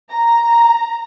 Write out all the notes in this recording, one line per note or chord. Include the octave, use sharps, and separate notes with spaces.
A#5